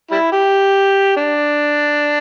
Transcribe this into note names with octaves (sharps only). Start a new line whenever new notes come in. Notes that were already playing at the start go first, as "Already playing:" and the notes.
G3 E4
G4
D4